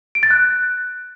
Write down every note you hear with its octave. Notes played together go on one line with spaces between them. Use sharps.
D7
A6
F#6